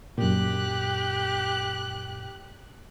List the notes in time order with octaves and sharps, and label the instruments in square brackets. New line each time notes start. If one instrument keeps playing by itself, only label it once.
[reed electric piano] F#2 A#2 [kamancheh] G4 F#6